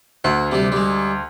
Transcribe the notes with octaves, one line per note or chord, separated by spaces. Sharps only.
D2 F#4
C3 G3
G3 G#3